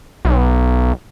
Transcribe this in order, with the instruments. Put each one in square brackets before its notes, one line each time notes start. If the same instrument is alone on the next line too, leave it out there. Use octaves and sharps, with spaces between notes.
[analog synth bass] B1